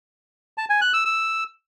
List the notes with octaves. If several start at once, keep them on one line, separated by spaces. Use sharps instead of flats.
A5
G#5
F#6
E6
E6